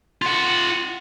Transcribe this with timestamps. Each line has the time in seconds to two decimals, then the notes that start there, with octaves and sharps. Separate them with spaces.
0.22 F4 F#5